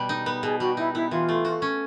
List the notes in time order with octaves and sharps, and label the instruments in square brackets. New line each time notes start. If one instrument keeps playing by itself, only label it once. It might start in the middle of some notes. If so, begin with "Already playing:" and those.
Already playing: [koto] B2 G3
D#4
B3
[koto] B2 [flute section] G#4
[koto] G3 [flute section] F#4
[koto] D#4 [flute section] E4
[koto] B3 [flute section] E4
[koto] E3 [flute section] F4
[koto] A3
F#4
C#4